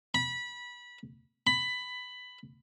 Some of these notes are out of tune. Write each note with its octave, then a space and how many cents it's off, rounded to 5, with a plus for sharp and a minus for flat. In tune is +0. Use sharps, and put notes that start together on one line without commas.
B5 -20
B5 +15